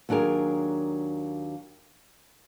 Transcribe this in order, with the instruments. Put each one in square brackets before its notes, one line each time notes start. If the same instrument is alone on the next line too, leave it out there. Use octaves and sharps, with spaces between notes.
[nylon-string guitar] D#2 F#3 D4 G#4 A#4